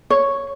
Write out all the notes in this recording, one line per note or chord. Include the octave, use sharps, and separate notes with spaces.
C#5